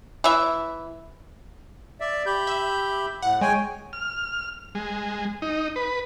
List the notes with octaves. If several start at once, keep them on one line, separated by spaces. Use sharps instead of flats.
E3 E5
D5 E5
G4 B5 G6
E5
A2 F#5
G#3 C#5 G5 G#5
F6
G#3
D#4
B4